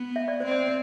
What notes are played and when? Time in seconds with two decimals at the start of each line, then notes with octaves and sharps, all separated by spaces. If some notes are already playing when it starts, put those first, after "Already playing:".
Already playing: B3
0.16 E5
0.28 D5
0.40 C4 C5
0.51 D5